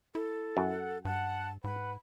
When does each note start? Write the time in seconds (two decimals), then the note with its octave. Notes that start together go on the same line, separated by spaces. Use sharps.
0.15 E4 A4
0.57 F#2 F#5
1.05 G2 F#5 A5
1.64 G#2 B4 F#5 B5